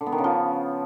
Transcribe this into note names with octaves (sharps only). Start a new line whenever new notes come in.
D3
B3
D#3
C#3
F3